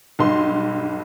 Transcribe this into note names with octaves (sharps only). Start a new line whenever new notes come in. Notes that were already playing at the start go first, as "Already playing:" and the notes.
B1 G2 C6